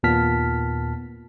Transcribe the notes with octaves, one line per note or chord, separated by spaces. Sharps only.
D#2 A#2 B3 A5 F6 B6